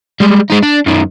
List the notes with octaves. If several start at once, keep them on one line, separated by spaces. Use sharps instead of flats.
G3 G#3
G#3 D#4
D4
F#2 D#3